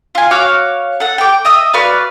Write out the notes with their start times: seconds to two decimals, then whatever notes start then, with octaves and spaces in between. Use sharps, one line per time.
0.15 F4 G#5
0.31 F#4 C#5 F5 D6
1.00 A4 F#5
1.18 G5 D6
1.45 D#5 E5 D#6
1.73 F#4 B4 D5 F5